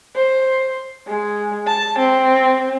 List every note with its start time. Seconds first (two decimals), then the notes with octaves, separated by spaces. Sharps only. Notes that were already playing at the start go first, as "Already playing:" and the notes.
0.16 C5
1.08 G#3
1.67 A5
1.99 C4